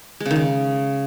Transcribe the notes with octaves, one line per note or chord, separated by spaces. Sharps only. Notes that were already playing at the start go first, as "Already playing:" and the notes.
G#3
C#3
D#3
C#3